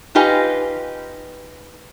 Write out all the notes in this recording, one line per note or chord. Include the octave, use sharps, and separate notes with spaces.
D#4 F4 G4 B4 D#5 G#5